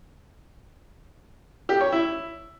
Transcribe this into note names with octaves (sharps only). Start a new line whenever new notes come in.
G4
C#5
E4